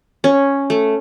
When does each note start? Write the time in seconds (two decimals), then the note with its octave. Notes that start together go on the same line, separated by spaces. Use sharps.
0.24 C#4
0.70 A3